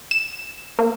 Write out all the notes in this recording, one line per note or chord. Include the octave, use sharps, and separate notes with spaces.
E7
A#3